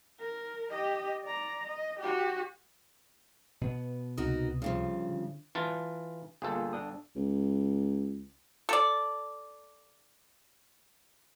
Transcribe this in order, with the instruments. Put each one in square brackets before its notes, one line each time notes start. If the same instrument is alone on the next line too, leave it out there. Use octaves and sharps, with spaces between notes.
[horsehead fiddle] A#4
G4 D#5
D5 A#5
D#5
F#4 G4
[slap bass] B2 B3
[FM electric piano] C#2 C3 D#6 [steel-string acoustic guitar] D#4 F#4 A#4
[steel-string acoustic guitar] G2 C#3 F3
[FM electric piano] D3
[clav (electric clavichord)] E3 F4 A5
[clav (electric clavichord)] G1 A4 [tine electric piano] A#3 F4 G#4
[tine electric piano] D4 D#6
[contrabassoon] C#2
[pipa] A4 D5